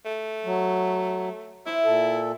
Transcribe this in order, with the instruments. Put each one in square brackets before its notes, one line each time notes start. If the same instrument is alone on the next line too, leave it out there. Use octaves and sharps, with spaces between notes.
[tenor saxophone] A3
[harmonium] F#3
[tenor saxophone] E4 [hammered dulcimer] C5 E5
[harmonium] A#2 A4